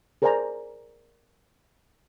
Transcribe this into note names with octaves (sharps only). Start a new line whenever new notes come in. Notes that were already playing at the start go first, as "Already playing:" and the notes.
G#4 A#4 C5 D5 G#5 A#5